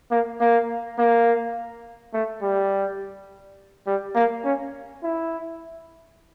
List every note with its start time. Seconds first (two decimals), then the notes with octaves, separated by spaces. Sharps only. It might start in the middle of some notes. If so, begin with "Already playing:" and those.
0.11 A#3
0.40 A#3
0.98 A#3
2.13 A3
2.42 G3
3.87 G3
4.15 A#3
4.44 C#4
5.03 E4